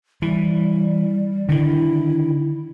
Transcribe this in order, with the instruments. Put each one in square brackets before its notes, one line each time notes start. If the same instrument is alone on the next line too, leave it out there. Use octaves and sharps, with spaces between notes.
[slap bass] E3 [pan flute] G3
[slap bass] D3 D#3 [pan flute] E4